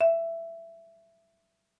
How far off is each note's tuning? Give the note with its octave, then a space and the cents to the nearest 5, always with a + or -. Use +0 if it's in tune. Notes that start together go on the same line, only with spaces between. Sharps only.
E5 +15